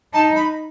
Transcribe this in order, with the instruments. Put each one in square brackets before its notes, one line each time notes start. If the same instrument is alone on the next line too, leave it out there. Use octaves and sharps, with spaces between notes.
[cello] D#4 [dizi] A5
[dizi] B5